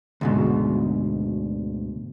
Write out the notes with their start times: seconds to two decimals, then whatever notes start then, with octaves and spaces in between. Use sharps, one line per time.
0.21 D2 G#2 B2